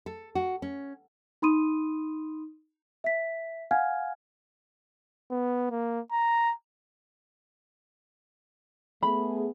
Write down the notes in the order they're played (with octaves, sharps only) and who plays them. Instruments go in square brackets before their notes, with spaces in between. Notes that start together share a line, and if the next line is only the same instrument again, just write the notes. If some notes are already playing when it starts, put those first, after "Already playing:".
[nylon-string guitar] A4
F#4
C#4
[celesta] D#4 B5 C6 D#6 D#7
E5 B6
F5 F#5 G#5 F6 G#6
[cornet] B3
A#3
A#5
[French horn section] A3 B3 G#4 [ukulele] B5